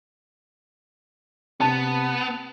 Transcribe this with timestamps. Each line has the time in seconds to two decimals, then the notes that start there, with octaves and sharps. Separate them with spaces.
1.60 C3 B3 A5